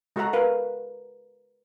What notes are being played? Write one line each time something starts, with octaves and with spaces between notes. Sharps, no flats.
G#3 F#4 A4 E5 F#5 A#5
A#4 B4 F5